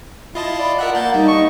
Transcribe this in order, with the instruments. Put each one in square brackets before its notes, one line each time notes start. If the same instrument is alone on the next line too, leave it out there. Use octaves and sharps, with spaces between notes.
[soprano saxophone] E4 [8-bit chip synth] F4 D#5 A5 [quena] B5
[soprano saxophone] D5
[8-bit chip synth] A#4 E5 F#6 [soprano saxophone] F#5
[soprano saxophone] A#3 [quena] F#5 [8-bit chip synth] A5 G6 A6
[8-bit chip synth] G3 [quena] D#4
[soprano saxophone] C#6